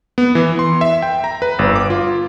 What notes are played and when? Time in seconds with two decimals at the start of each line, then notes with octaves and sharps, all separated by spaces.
0.18 B3
0.35 E3
0.59 C6
0.81 E5
1.02 G5
1.24 A#5
1.42 B4
1.59 G1
1.76 D6
1.90 F4